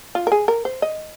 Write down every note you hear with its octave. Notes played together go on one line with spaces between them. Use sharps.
F4
A#4
G#4
A#4
C5
D#5